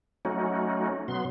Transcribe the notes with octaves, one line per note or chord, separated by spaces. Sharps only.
F#3 A3 C#4 D#4 F#4
B2 F#3 B3 C6